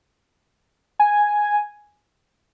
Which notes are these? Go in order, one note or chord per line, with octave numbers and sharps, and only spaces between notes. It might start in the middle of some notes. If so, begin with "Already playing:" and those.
G#5